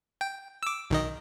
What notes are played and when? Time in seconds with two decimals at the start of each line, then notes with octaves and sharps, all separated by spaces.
0.21 G5
0.63 D6 E6
0.90 B1 D#3 D#5